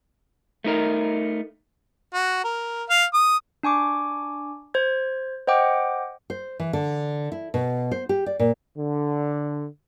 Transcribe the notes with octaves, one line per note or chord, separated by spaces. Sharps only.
A3 D#4 A#4
F#4
A#4
F5
D#6
D4 G#5 C#6 D6
C5 G#6
C5 D#5 F#5 G5 D6
C5
E3
D3
E4
B2
C5
G4
D5
A#2
D3